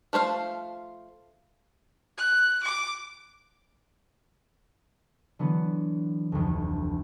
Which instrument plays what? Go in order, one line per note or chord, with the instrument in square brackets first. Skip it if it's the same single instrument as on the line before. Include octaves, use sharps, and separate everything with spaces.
[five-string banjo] F3 A3 C5 F5
[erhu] F#6
D6
[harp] D3 E3 F#3 B3
F1 D2